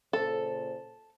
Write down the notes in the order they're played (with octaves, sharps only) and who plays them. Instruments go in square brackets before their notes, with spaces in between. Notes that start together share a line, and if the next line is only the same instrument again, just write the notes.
[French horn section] A#2 C#3 C5 [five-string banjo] A4